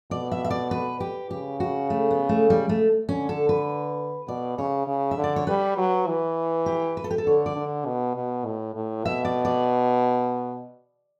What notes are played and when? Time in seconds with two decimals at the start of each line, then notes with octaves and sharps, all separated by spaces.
0.11 B2 D5
0.32 E5
0.45 E5
0.51 D5
0.71 B4
1.00 G4
1.31 C#3 G4
1.60 F#4
1.90 A3
2.11 B3
2.29 A3
2.50 G3
2.69 A3
3.09 D3 C#4
3.29 A4
3.49 B4
4.28 B2 D5
4.58 C#3 C#5
4.87 C#3
5.11 E5
5.18 D3
5.24 D5
5.36 C#5
5.47 G3 B4
5.77 F#3
6.07 E3
6.66 G4
6.97 B4
7.04 A4
7.11 G4
7.18 A4
7.26 D3 C#5
7.46 D5
7.56 D3
7.86 B2
8.16 B2
8.45 A2
8.75 A2
9.04 B2 E5
9.25 D5
9.45 D5